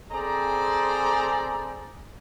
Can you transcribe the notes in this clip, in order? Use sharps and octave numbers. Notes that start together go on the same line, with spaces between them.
C4 G#4 A4 C5 D5 A#5